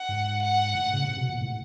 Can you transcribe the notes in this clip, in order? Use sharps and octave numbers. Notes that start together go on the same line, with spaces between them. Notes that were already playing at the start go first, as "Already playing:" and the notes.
Already playing: F#5
G#2
F#5
A2
C#3
C3
B2
A#2
A2